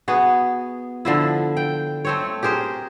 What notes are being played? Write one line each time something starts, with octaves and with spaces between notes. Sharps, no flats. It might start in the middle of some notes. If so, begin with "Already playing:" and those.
B3 F#4 G#4
D3 F3 E4
G5
A3 C4 C#5
G4 G#4 A#4 C5